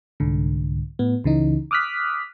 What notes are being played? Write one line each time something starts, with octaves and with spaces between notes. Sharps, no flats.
C2 G#2 D3
A2 B3
C#2 C#3 E3 D#4
D6 D#6 F6 F#6 B6